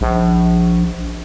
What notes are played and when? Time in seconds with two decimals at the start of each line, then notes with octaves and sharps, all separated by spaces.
0.01 A#1